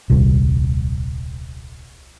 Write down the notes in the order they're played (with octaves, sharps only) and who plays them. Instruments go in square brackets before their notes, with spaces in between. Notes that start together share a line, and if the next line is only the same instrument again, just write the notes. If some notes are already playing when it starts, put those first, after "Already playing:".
[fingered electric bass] D#1 C2